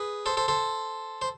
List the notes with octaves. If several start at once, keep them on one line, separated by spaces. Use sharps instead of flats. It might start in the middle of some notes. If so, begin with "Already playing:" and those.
Already playing: G#4 B4
A4 C5
A4 C5
A4 C5
C5